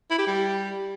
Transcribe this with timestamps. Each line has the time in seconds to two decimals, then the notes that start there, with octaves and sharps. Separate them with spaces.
0.10 E4
0.19 G4
0.27 G3